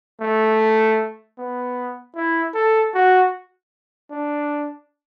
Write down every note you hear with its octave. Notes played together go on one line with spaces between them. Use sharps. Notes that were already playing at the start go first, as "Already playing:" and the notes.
A3
B3
E4
A4
F#4
D4